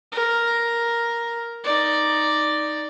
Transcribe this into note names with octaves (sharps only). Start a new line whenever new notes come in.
A#4
D#4 D5